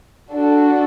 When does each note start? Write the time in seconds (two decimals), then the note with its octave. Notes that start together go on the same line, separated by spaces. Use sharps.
0.32 D4 F#4 A4